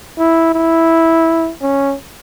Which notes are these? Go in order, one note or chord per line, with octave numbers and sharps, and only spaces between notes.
E4
E4
C#4